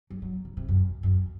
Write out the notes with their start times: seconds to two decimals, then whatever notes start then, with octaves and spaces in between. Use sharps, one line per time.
0.10 F#3
0.22 F#3
0.45 C#3
0.57 C3
0.69 F#2
1.03 F#2